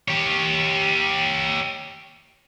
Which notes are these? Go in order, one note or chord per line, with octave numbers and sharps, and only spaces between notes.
G4 C#5